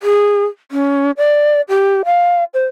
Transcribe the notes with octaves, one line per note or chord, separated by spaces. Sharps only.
G#4
C#4
D5
G4
F5
C5